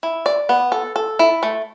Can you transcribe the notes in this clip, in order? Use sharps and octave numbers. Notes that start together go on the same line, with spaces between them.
E4
D5
B3
A4
A4
E4
A3